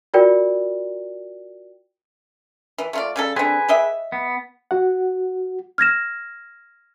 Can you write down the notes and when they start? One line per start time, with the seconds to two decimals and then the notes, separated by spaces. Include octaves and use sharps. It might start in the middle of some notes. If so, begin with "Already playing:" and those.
0.14 F4 F#4 A#4 D5 G5
2.78 E3
2.93 A3 F4 D5
3.16 C#3 G3 A4
3.36 D3 C4 G#4 B4 G#5
3.69 G4 D#5 E5
4.12 B3
4.71 F#4 F#5
5.78 F6 G#6 A#6 E7